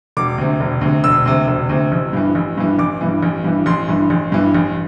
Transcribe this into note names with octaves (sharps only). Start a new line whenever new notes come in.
E1 D6
D2 C3
E1
D2 C3
E1 E6
D2 C3
E1
D2 C3
A1
G2 E3
A1
G2 E3
A1 D6
G2 E3
A1
G2 E3
A1 C6
G2 E3
A1
G2 E3
A1